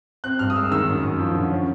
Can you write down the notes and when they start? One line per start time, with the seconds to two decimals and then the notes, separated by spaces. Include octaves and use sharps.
0.24 C4 F#6
0.39 G2 F6
0.50 D#6
0.55 G#3 E6
0.71 D#3 E6
0.87 F#2
1.03 F#2
1.19 F3
1.35 D3
1.51 C#4